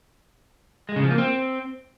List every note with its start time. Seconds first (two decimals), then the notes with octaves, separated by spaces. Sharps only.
0.89 G#3
0.96 C#3
1.03 F3
1.11 A#3
1.18 C4